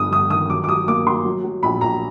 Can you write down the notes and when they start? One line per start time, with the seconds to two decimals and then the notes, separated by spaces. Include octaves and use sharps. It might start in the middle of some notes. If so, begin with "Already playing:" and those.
Already playing: G1 G2 D#6
0.11 G1 D#6
0.30 D#3 D#6
0.50 F#3 D6
0.64 D6
0.68 F#3 D#6
0.87 A#3 D6
1.06 F#3 C6
1.25 F#3
1.43 F#3
1.63 A#1 B5
1.81 A#1 A#5